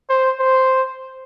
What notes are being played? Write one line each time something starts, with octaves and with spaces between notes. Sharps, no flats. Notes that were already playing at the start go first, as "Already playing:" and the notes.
C5
C5